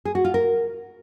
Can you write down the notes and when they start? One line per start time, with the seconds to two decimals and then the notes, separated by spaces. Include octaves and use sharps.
0.05 G#4
0.15 F#4
0.25 F4
0.34 A#4